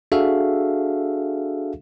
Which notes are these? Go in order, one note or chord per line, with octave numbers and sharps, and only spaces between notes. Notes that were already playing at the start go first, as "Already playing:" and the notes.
D4 F#4 G#4 A4 E5 F5